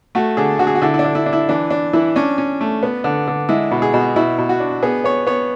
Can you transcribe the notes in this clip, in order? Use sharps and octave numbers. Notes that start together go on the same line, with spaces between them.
A3 F#4
D3 G#4
D3 F#4
G#4
F#4
D3 E4
E4
D4
D3
E4
D4
E4
E3 D4
D4
E3 E4
C#4 D4
C#4
A3
B3
D3
D3
G#3 E4
B2
G#4
B2
B2 E4
B2
F#4
D4
B3 G#4
B3 C#5
B3 C#5